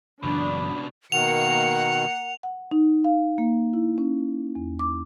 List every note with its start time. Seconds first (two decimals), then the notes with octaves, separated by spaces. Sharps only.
0.23 F#1 C#2 B2 E3 D4 B5
1.12 B2 D#3 A#3 F#5 C#7 F7
2.43 F#5
2.71 D#4
3.04 F5
3.38 A#3
3.73 E4
3.98 C#4
4.55 E2
4.79 D6